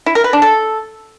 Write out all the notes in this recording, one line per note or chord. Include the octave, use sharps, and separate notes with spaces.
E4
A#4
B4
D4
A4